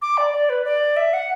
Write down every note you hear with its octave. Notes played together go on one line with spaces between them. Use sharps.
D6
D5
D5
B4
D5
E5
F#5